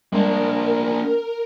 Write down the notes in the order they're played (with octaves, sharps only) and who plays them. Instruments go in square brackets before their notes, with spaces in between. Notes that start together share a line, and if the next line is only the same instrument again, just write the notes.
[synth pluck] G3 G#3 [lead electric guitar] A#3 D4 [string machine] A#4